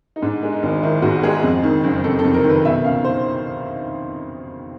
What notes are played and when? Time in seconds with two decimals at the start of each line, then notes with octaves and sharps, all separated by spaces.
0.16 D#4
0.22 G#2 D4
0.43 G#3
0.53 D#4
0.63 G#1
0.83 D#3 E4
1.02 G#2 F#4
1.23 G#3 G#4
1.43 F2
1.63 D#3
1.83 F#1
2.04 C3 A4
2.19 A4
2.24 F2
2.34 A#4
2.44 D#3
2.49 B4
2.65 B2 E5
2.84 C#2 F5
3.04 C5